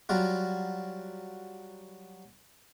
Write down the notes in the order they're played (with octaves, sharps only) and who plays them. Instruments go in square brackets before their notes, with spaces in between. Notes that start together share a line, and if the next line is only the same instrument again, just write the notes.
[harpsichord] F#3 G3 F4 F#4